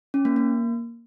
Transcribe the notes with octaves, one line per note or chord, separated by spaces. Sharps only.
C#4
A#3
A#3